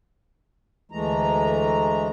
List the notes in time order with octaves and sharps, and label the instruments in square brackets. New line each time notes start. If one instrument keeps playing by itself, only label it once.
[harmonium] D2 E3 G#3 A3 A#5